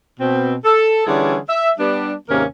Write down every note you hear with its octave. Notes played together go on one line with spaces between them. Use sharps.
B2 C4
A4
D3 E3 G3 C#4 E4 G#4
E5
G3 B3 D4
D#2 G#2 C3 A#3 C#4 A#4